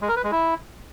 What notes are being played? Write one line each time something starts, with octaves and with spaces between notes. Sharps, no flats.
G#3
A#4
B4
G#3
E4